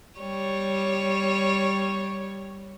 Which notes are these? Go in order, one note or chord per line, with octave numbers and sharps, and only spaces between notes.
G3 C#5